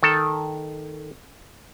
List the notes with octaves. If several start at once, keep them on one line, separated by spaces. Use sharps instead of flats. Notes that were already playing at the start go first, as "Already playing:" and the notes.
D#3 A4